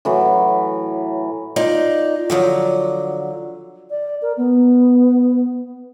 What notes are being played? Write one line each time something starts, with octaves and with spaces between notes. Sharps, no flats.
A2 E3 F#3
D#4 F4 D5
D3 F3 F#3
D5
A#4
B3